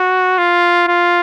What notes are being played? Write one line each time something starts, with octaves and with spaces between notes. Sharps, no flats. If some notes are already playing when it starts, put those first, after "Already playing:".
Already playing: F#4
F4
F4